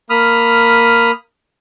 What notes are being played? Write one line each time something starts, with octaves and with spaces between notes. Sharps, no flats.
A#3 B5 D#6 F6